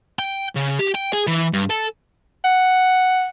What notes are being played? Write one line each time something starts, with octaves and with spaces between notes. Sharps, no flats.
G5
C#3
G4
G5
G#4
E3
G2
A4
F#5